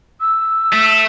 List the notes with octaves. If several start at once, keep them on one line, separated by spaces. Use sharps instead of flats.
E6
A3